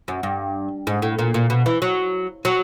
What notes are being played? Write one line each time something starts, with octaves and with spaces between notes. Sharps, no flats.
F#2
G2
G#2
A2
A#2
A#2
B2
E3
F#3
F#3